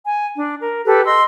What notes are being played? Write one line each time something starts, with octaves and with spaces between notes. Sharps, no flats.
G#5
D4
A#4
G4 A4 B4
D#5 C6 E6